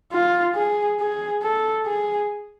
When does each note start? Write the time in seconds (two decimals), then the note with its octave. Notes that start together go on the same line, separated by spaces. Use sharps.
0.13 F4
0.56 G#4
1.00 G#4
1.42 A4
1.86 G#4